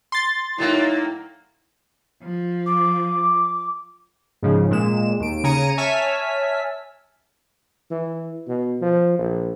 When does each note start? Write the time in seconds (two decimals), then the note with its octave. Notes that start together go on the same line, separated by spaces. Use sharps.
0.12 C6 A6
0.58 A2 F#3 A#3 D#4 E4
2.23 F3
2.66 D6
4.42 G#2 C#3 F3
4.71 A#2 G#3 E7
5.20 D#2 D7
5.44 C#3 G#5 A#5 C#7 D#7
5.78 C#5 E5 G#5 A5 F6 B6
7.90 E3
8.47 B2
8.81 F3
9.18 A#1